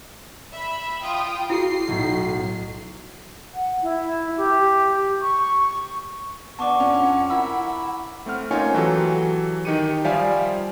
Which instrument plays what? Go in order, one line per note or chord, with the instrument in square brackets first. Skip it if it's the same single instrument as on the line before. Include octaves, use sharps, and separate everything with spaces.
[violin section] E5 B5
F4 G5 D#6
[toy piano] E4 F#4 G#4 [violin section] C7
[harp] B1 A2
[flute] F#5
E4
G4
C#6
[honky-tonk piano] B3 D4 [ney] F#5 [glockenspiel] A5 C#6 D6
[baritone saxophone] F2 [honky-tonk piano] C#4
[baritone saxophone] E4 [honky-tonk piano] A#4 E6
[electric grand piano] A3 C4 F#5 F6
A#3 C#4 D#4 F4 C#5 G#5
E3 F#3 F#4 G4 A4
D#3 D#4 G4 C#7 D#7
F3 G3 D5 E5 F5 G#5